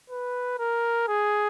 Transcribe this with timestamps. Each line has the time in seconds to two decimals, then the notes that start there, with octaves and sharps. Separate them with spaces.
0.10 B4
0.59 A#4
1.08 G#4